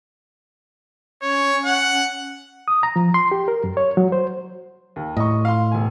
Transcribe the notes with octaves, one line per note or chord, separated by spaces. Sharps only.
C#4 C#5
F#5
D#6
A#5
F3
C6
G4
A#4
F#2
C#5
F#3
C5
D#2
A2 D#5 C#6
F5 C6
E1 G#5